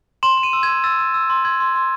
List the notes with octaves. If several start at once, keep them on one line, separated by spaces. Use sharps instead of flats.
C6 E7
C6
D#7
E6
G#6
E6
E6 A6
E6
E6
C6
C6 G#6
C6
C6